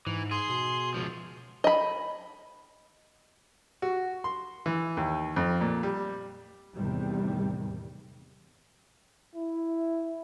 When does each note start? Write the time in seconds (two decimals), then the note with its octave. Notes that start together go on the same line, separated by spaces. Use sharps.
0.07 G#2 E3
0.31 G#4 C6
0.50 B2
0.94 C#2 F3
1.64 D#5 B5
3.82 F#4
4.24 C6
4.66 E3
4.97 D#2
5.36 F2
5.61 A#2
5.83 G3
6.76 E2 A2 C3 D#3 G3
9.35 E4